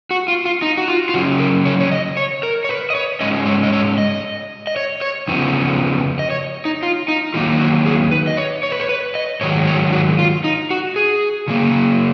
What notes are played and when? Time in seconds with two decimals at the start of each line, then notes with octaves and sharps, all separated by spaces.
0.11 F#4
0.28 F4
0.45 F4
0.62 D#4
0.77 F#4
0.88 F4
1.09 F4
1.14 C#3 F#3 C#4 F#4
1.40 A#4
1.65 C#5
1.80 C#5
1.92 D#5
2.17 C#5
2.43 A#4
2.64 C#5
2.69 B4
2.90 D#5
2.95 C#5
3.21 G#2 D#3 G#3 C#4 D#5
3.46 C#5
3.63 D#5
3.72 C#5
3.98 D#5
4.67 D#5
4.76 C#5
5.01 C#5
5.28 F2 C#3 F3 B3
6.19 D#5
6.30 C#5
6.65 D#4
6.83 F4
7.08 D#4
7.34 D#3 F#3 A#3 D#4 F4
7.60 F#4
7.86 G#4
8.11 B4
8.27 D#5
8.37 C#5
8.63 C#5
8.72 B4
8.80 C#5
8.89 B4
9.15 D#5
9.41 G#2 D#3 F#3 C#5
9.67 C#5
9.93 F#4
10.19 F4
10.44 D#4
10.71 F#4
10.96 G#4
11.48 C#3 F#3 A#3